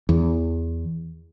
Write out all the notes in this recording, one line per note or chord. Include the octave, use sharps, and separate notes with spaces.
E2